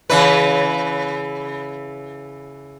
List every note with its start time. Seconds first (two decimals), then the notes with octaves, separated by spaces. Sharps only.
0.10 C#3 E3 B4